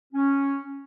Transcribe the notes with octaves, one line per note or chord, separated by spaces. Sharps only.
C#4